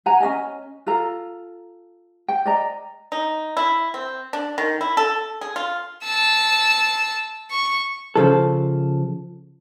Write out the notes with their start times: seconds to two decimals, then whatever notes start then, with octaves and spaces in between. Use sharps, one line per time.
0.06 F#5 G#5 A#5
0.20 C#4 G#4 D#5 G#5
0.86 F4 A4 A#5
2.28 G5
2.46 D5 D#5 A#5
3.12 D#4
3.57 E4
3.94 C4
4.33 D4
4.58 D#3
4.81 E4
4.97 A4
5.41 G#4
5.56 F4
6.04 A5 E6
7.51 C#6
8.16 C#3 F3 A4